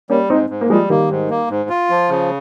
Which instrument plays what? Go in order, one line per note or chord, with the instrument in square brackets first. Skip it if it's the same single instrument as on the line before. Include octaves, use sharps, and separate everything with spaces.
[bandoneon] G3 [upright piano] A#3 C#4
[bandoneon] G#2 [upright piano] C4 D#4
[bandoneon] G#2
[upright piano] A#3
[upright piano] F3 G#3 [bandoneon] G3
[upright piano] D#3 G3 [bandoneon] A#3
[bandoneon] G#2
A#3
G#2
F4
F3
C#3